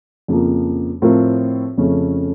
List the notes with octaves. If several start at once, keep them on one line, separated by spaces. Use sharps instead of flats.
F2 C#3 F3 A#3
A2 F3 C4 F4 A#4
F2 C#3 A3 C#4